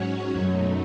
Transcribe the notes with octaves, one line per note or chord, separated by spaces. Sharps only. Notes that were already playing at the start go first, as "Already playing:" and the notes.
Already playing: G#2 F#3 C#4 F#4 C#5
F#2 B2 F#3 A3 D#4